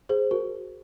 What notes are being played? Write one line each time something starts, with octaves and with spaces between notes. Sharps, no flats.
G#4 C5
F#4 A#4